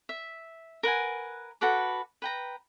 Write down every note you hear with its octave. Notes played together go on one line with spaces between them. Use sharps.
E5
A#4 B4 F#5 G#5
F#4 A4 B4 D6
B4 G5 A#5